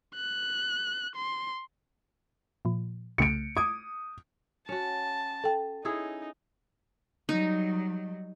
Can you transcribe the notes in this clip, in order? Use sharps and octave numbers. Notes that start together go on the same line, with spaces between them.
F#6
C6
A#2 F3
C2 C#3 A3 C#7 D7
D6 D#6 G#6 D7
C#4 F#4 A5
A4 G5
C#4 D#4 E4 G#4
F#3 G3 D#4